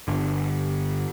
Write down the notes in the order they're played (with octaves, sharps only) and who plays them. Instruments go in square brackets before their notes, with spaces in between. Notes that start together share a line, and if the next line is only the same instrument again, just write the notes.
[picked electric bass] G1 D3